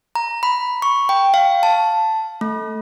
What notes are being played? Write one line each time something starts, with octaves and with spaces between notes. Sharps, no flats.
A#5
B5
C#6
G5
F5
A5
A3